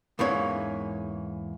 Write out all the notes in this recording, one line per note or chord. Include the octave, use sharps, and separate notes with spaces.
E2 G#2 E3 A#3 C#4 C#5